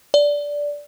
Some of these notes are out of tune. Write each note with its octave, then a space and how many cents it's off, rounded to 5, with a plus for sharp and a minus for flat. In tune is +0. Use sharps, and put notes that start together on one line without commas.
D5 -10